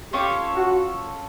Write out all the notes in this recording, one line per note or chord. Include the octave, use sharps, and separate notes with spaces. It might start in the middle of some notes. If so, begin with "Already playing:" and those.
C#4 F4 G4 A4 C#5
F#4